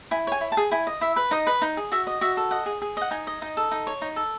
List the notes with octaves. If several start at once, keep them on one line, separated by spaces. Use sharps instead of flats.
E4 G#5
C#5 G#5
E4
A5
G#4
E4 G#5
D#5
E4 E5
B4
D#4 D#5
B4
D#4
G#4
F#4 E5
D#5
F#4 E5
A4
D#5 F#5
G#4
G#4
D#5 F#5
D#4 G#5
D#5
D#4
A4
D#4
C#5
D#4
A4